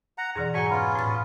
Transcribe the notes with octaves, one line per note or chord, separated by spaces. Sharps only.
F#5 A#5
F2 B2 E3 G#4 D5 A#5
G#2 F#3 G#4 F#5 G#5 A#5 C#6
B3 C#4 F4 B5
A2 A6